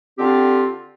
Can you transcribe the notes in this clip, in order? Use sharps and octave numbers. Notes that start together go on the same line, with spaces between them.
D3 C4 F4 G4